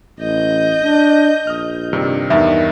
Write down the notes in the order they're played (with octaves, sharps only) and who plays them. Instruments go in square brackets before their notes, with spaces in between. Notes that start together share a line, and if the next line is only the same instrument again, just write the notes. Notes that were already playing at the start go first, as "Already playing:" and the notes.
[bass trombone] A1 [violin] D#5 G6
[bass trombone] D4
[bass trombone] A#1 [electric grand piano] D#6 F6
[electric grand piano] G2 C3 D#3
[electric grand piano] E2 G2 [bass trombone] D#3 [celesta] E5